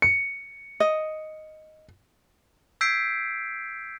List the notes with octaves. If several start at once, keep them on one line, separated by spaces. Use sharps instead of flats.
C#7
D#5
E6 G6 G#6 B6 C7 D7